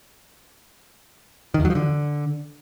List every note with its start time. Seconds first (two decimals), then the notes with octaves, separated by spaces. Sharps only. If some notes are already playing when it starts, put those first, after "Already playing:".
1.54 D#3
1.60 E2
1.65 F#3
1.70 F3
1.75 D3